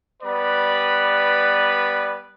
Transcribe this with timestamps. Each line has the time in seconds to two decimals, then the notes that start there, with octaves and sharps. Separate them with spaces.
0.23 G3 B3 B4 D5 B5